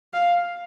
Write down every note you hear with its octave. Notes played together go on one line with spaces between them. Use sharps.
F5